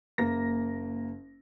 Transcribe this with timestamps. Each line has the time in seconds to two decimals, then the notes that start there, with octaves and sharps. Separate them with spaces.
0.18 F#1 A#3 A#6